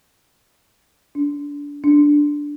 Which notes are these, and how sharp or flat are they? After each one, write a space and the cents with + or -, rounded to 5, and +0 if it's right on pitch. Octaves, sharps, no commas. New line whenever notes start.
D4 -25
D4 -5